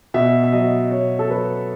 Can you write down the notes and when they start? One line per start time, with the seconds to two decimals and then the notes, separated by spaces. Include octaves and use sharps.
0.14 B2 E5
0.44 E5
0.52 F#3 D#5
0.91 B2 C#5
1.19 A4
1.30 F#3 B4